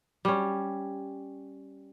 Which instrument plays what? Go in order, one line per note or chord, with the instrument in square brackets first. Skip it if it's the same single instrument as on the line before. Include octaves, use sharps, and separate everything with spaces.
[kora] G3 C#4